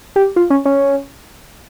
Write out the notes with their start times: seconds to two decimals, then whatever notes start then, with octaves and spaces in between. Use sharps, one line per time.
0.16 G4
0.36 F4
0.50 C#4
0.65 C#4